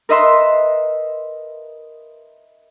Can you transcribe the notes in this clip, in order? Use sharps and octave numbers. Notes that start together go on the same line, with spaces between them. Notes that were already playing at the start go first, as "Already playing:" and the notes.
A#4 B4 D#5 E5 C6